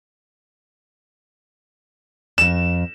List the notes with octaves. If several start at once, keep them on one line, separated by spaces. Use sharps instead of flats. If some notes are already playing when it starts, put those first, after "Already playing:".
F2 G#2 E7